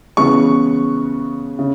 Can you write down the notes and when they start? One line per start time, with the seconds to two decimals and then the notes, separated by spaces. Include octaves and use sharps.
0.17 C#3 E3 G#3 B3 C#6
1.59 C#3